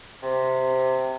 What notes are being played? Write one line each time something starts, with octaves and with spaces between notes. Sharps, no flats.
C3